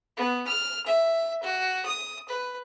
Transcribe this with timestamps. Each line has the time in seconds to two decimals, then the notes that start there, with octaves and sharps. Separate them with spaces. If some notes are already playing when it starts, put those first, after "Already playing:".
0.17 B3
0.47 F6
0.86 E5
1.43 F#4
1.86 D#6
2.29 B4